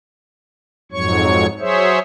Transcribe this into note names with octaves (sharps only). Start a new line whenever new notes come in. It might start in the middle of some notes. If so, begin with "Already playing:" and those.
F2 G#2 F#3 C#5 C#6
F#3 G#4 C5 C#5 E5